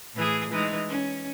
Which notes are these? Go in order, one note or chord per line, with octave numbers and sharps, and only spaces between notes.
A2 E3 G#4
E3 G#3 D#4
C#4